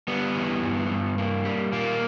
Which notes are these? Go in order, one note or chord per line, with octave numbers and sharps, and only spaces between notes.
G3 B3
E3
G2
G2
A#3
G3
A#2 A#3